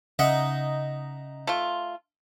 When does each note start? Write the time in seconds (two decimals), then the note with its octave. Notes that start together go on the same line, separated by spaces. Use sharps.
0.19 C#3 D#4 E5 F#5
1.47 A3 F4